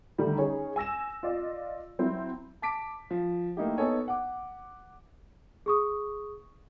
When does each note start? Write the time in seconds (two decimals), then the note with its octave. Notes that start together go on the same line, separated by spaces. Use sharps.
0.18 D3 D#3 G3 A3 G4
0.38 C#4 D#4 G#4 C#5
0.76 G#5 E6 A#6 E7
1.23 F4 D5 D#5
1.99 F#3 C4 E4
2.62 A5 D6 B6 D7
3.10 F3
3.57 A3 A#3 D#4 E4 G4
3.77 B3 D#4 A4 C#5 G#5
4.08 F#5 D6
5.66 G#4 C#6 D#6